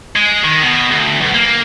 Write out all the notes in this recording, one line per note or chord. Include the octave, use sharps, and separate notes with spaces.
G#3
D#3
B2
D2
B1
A#3